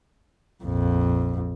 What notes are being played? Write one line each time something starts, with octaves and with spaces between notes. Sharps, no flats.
A#1 F2